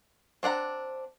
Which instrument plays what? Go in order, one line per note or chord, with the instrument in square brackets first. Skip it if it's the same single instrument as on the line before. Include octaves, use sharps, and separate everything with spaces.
[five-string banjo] C4 D4 F#5 A#5